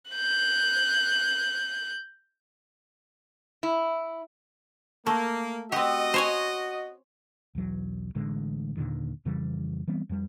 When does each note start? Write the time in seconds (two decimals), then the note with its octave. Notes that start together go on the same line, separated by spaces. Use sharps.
0.11 F#6 G6
3.63 E4
5.07 A3 A#3
5.72 C4 F#4 G4 D#5
6.14 C5 C#5 G#5
7.55 B1 E2 F#3
8.15 A1 A2 D3 G#3
8.77 D#2 A#2 D3 D#3
9.25 F2 C#3 E3 G3
9.88 E3 G3 B3 C4
10.09 F2 G3